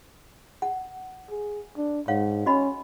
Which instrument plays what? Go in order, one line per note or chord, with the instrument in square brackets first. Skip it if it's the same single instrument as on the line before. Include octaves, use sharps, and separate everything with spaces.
[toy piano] F#5
[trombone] G#4
D4
[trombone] G#2 [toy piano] C#5 F5 F#5
[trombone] C#4 [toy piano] F#4 D#5 B5